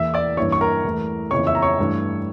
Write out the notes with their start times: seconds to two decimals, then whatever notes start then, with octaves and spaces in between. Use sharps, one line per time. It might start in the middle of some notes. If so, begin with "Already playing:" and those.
Already playing: E2 E3 A#3 E5 E6
0.14 D5 D6
0.37 G2 E3 A#3 C#5 C#6
0.52 C#6
0.61 A#4 A#5
0.84 E2 E3 A3
1.31 F2 C#3 E3 A#3 C#5 C#6
1.47 E5 E6
1.55 A#5
1.62 C#5 C#6
1.79 G2 E3 A3